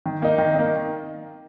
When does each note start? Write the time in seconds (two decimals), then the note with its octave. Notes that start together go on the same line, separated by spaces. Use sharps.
0.06 D#3
0.22 A#3 D#4
0.38 D#3
0.55 A#3 D#4